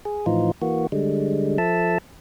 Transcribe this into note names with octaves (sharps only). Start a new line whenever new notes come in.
G#4
A2 E3 F3 D#4 F4
E3 A#3 F#4
D3 G3 G#3
F3 A4 E5 A5